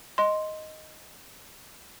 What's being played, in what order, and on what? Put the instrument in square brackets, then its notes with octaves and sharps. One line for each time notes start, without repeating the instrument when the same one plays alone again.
[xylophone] D#5 C6